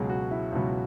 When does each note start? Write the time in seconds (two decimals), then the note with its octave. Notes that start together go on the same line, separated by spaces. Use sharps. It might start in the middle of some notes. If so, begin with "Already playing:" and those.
Already playing: C#2 B2 F#3 G#4
0.09 F#4
0.31 E4
0.52 C#2 B2 F#3